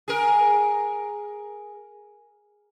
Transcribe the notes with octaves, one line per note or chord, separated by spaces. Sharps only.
G#4 A#4